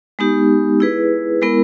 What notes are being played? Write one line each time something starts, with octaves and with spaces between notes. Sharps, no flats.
G#3 B3 D#4 G4
E4 G#4 B4
G#3 B3 E4 A#4